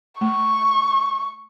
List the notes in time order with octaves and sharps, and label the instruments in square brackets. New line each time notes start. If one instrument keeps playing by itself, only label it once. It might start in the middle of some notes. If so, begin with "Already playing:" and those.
[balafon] A3 [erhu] C#6